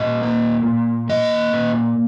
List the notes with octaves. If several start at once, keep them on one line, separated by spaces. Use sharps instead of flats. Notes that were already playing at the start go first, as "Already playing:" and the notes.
Already playing: A#2 D#5
A#3
A#2
A#3 D#5
A#2